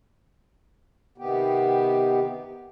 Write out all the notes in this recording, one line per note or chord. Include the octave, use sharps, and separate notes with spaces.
C3 D#3 B3 G4